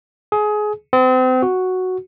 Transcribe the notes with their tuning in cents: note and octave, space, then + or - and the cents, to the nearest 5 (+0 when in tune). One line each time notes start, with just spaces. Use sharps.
G#4 +20
C4 -35
F#4 +0